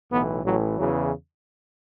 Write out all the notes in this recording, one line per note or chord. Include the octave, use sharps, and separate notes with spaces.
B1 A2 E3 B3
A1 A2 E3 F#3
E2 C#3 E3 F#3